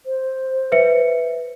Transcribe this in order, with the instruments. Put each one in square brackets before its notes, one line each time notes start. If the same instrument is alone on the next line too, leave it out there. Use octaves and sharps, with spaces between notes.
[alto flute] C5
[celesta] B4 E5 C#7